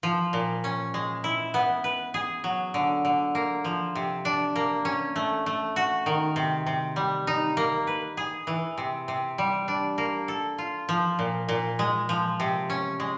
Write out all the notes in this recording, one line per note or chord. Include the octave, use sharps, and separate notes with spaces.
F3
A#2
C#4
G#3
E4
B3
B4
G#4
F#3
D3
D3
A#3
F3
C3
D4
A#3
C#4
A3
A3
F#4
D#3
C3
C3
G3
D#4
A#3
B4
G#4
E3
C3
C3
G3
D4
A#3
A4
F4
F3
A#2
A#2
G#3
F3
C3
C#4
G#3